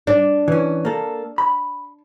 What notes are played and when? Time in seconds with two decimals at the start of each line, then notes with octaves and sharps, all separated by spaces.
0.07 D4
0.48 E3 C#4
0.85 A#3 A4
1.38 B5